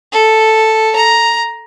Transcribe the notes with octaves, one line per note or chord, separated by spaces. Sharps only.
A4
A#5